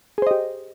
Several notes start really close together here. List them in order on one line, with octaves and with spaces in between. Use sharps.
G#4 C5 D#5 G4